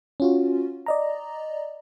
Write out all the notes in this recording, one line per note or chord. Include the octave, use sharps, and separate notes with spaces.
C#4 F4 F#4
D5 D#5 A#5